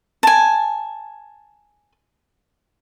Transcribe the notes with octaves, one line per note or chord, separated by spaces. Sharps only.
G#5 A5